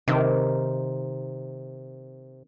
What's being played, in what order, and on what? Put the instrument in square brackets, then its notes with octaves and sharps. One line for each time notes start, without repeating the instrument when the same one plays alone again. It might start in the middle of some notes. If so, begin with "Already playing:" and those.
[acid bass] C3 [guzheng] D#3 A#3 C4